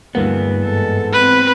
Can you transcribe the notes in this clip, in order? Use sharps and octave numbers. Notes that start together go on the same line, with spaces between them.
D2 G2 E3 A#3 B3
G#2 A4
C4 B4